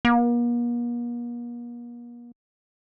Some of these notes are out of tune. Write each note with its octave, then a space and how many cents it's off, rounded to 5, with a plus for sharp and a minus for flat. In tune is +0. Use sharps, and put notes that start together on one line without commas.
A#3 +45